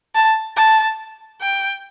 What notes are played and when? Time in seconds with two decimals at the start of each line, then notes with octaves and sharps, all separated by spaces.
0.15 A5
0.57 A5
1.41 G5